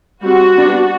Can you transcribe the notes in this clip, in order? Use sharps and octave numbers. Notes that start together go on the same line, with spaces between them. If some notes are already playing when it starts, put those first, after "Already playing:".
G3 C4 F#4
G3 B3 D4